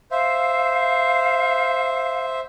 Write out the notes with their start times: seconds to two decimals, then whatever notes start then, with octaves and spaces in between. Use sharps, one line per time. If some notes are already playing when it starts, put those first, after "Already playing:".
0.11 C5 E5 F5